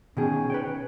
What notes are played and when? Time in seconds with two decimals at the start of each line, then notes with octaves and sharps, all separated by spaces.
0.17 B2 D#3 C#4 G#4
0.50 B4 C#5 G5